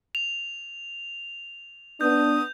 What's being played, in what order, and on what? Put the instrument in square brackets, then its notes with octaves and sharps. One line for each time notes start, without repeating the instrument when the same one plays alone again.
[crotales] F7
[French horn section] B3 D4 [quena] D#6 [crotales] G6